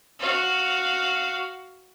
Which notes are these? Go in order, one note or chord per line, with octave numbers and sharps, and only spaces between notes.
F#4 F5